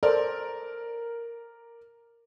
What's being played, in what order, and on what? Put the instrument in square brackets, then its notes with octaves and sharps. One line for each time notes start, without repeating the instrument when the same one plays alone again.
[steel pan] A4 C5 [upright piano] A#4 [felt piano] D5